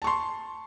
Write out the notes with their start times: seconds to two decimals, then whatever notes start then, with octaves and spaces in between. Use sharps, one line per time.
0.02 A5
0.04 C#6
0.07 C6